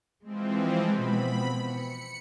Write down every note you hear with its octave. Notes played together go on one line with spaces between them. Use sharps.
E3 F3 G#3 C4
B2 B3 C4 B5
C#7